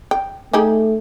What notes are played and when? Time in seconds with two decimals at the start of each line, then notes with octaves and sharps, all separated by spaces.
0.11 G5
0.53 A3 D#4 G4 G#4